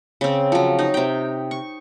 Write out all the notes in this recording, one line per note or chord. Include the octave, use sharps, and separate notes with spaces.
C#3 C4
F3 F#3
D#4
C3 G5
C#6